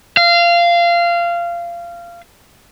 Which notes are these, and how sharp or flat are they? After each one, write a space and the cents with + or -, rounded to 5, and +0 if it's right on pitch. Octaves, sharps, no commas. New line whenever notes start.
F5 -20